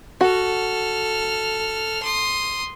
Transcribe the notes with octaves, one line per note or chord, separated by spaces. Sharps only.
F#4 A4 F6
C6 D#6